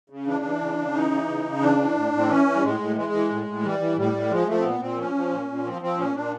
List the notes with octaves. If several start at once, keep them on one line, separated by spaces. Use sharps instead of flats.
C#3
E3 D4
E3
C#3
C#3
E3 D#4
E3
C#3
C#3
E3 D4
E3
A2
A2
C4
E3 C#4
E3
G3
A2 G#3
A2
E3 G#3
E3
A2
A2
E3 G3
E3
A2 G3
A2
F3 G#3
F3 A3
C4
A#2 B3
A#2 C4
F3 C#4
F3
A#2
A#2
F3 C4
F3 C4
A#2 C#4
A#2 D4